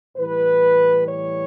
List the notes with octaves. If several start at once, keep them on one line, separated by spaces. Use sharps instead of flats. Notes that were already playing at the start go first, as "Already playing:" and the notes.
A2 E3 G3 B4
C#5